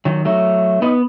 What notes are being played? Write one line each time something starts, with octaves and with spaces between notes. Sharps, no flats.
D#3 F#3
F#3 A3
B3 D#4